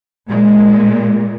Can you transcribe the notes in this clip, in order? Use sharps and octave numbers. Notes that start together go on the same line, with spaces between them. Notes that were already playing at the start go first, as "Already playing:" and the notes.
A#2 G#3